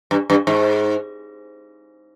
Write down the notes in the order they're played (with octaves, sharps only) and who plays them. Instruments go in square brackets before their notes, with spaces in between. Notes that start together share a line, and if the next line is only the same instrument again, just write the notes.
[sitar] G2
G2
G#2